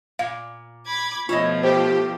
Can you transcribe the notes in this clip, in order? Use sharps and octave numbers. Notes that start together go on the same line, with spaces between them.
A#2 F5
B5 D6 G#6
B2 F3 A3 E4 F4 C#5 D#5
G4 C5